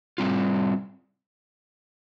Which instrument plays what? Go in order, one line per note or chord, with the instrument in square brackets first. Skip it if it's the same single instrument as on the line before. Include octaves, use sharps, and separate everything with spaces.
[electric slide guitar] G3 C4 F4